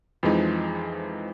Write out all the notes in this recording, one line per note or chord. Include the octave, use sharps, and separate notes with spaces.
F2 E3 F3 G#3 D#4